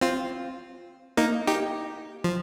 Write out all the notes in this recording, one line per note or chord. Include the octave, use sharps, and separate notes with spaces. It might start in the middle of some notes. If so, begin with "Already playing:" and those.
C4 F4
A#3 D#4
D#4 G4
F3